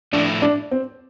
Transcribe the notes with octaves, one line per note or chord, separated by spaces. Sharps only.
A2 F3 A3 D4 E4
D4
C4